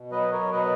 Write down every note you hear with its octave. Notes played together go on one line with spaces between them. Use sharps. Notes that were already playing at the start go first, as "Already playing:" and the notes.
Already playing: B2
F#3 B4 D#5
A#4 C#5
B2 B4 D#5